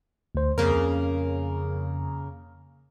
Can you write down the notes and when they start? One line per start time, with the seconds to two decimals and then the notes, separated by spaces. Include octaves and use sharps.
0.35 D2 C5
0.58 F2 C#3 A#3 A#4